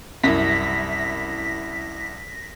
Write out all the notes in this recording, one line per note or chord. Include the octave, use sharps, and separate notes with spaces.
C2 F#2 E4 A#6 B6